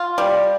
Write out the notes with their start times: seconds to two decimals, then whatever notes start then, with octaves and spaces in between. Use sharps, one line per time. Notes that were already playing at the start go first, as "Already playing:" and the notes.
Already playing: F4
0.18 G3